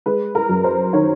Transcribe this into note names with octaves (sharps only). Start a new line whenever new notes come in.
G#3 B4
A#4
F#2
C5
D#3 C#5